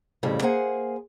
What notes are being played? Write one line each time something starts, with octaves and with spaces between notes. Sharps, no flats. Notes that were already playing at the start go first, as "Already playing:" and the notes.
F2 A2 C#3 G3
A#3 G#4 C5 F#5 G#5